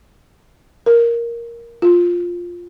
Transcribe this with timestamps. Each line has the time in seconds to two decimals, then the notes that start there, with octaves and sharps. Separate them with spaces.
0.86 A#4
1.82 F4